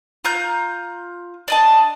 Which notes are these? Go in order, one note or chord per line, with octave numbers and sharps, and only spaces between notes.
F4 A#5 G6
D4 D#5 A5